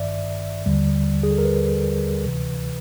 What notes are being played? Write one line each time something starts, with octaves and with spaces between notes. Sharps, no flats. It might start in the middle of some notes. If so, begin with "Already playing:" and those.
Already playing: G#1 G2 D#3 D5 E5
D#2 D3 G3
G#4
A4
A#4
B4
D2 C3 E3